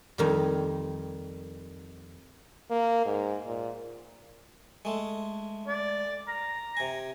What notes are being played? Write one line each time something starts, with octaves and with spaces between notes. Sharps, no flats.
F2 D#3 G3
A#3
G#2
A#2
G#3 A3
D5
A#5
C3 G#5